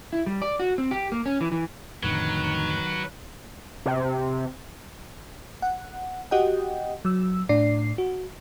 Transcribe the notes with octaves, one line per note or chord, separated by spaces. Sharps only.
E4
G3
D5
F#4
C4
G4
A#3
C#4
E3
E3
F2 A2 D3 D#3 F#3 B4
C3
F#5
F#4 G4 D#5 F#5 G5
F#3 E6
A2 D4 D5 C7
F#4